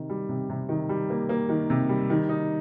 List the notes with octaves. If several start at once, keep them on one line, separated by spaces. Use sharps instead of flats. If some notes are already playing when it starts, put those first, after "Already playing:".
Already playing: C3 D#3
G3
C3
C3
D#3
G3
A#3
A#3
D#3
C3
G3
D#3
D#4